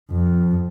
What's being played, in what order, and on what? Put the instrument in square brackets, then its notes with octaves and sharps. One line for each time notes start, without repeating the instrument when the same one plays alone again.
[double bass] F2